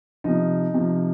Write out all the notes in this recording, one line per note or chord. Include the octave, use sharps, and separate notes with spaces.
C3 F3 D#4
C3 F3